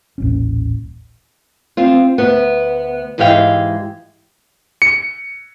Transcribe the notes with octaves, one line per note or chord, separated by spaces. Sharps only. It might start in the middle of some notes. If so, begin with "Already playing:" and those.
D#1 A1 C#4
C4 F4
D2 B3
G#2 E3 G#3 G4 F5 G5
C#7